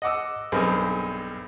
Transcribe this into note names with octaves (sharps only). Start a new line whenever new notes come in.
D#5 F#5 D6 E6
B1 G2 C4 G#4 A#4